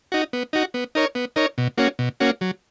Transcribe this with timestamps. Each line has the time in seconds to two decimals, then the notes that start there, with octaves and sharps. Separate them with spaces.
0.12 D#4 F#4
0.33 B3
0.53 D#4 F#4
0.74 B3
0.95 D#4 A#4 C#5
1.15 B3
1.36 D#4 A#4 C#5
1.58 B2
1.78 A#3 C#4 F#4
1.99 B2
2.20 A#3 C#4 F#4
2.41 F#3